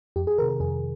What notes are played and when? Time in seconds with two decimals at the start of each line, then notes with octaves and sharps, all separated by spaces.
0.16 F2 G4
0.27 G#4
0.38 D#3 A#4
0.42 C3
0.49 A#4
0.60 F2 G#4